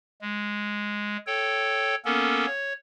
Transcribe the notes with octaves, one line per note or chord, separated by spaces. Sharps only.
G#3
A4 C#5 G5
A#3 B3 C#4 A4 A#4
C#5